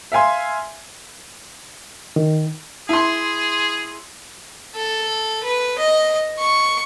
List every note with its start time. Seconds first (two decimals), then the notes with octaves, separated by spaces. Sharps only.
0.12 E5 F5 G#5 C6
2.16 D#3
2.89 E4 G#4 C6
4.76 A4
5.43 B4
5.78 D#5
6.38 C#6